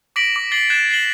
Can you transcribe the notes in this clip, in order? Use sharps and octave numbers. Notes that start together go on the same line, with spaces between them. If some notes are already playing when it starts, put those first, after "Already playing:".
D6 A#6 B6 D7 F#7
D6
D6 A6 C7 F#7 G7
F#6 G#6 A6 C7 E7 G7
C7 E7 F#7 G7